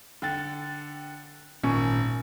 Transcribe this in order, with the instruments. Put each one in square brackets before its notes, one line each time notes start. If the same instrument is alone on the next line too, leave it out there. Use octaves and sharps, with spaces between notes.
[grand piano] D3 G5 A6
[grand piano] G#1 [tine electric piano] A#2 [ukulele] C#4